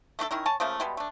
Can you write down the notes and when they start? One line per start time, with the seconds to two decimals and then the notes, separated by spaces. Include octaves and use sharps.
0.19 A3 D4 F#4 A4
0.31 D#3 C#4 E4 A#4
0.46 C#5 G#5 A5
0.60 C#3 F3 A3 A#3
0.80 B2 G3 G#3
0.97 A3 D4